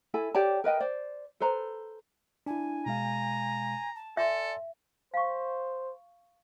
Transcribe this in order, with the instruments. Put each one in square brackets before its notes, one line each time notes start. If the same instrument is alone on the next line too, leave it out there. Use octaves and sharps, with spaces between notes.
[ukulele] E4 A4 G#5
G4 C#5 D5 A5
A#4 B4 D#5 G5
C5 D5
A4 B4 C5 A#5
[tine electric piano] D4 E4 [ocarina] G#5
[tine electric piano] B2 G#3 F5 [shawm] A#5
[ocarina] A5
[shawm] A4 [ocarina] D5 [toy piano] E5 [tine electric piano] G#5 C6
[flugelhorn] C5 [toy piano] F5 C#6